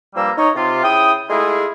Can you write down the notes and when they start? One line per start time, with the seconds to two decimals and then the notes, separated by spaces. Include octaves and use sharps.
0.16 G2 F3 G3 A#3 A#5 E6
0.37 D#4 C#5
0.55 C3 F4
0.83 C#3 E4 G5 D#6
1.29 G#3 A3 E4 F4 G#4